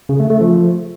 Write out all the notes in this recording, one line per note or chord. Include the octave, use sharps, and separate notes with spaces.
C#3
A3
A3
F3